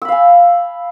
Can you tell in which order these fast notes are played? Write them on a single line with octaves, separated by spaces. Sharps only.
E6 B5 F5 G#5